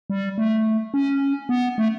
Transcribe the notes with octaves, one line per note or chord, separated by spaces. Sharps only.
G3
A3
C#4
B3
A3